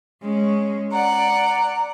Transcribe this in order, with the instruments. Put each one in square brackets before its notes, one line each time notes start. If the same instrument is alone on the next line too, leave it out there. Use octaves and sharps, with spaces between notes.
[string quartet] G#3 C#4
[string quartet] D5 F#5 [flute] A#5